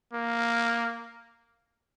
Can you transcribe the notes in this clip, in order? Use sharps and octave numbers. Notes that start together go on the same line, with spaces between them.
A#3